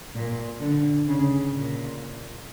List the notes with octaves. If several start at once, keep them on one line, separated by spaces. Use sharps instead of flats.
A#2
D3
C#3
A#2